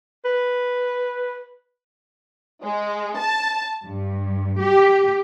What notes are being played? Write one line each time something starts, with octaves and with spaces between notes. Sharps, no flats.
B4
G#3
A5
G2
G4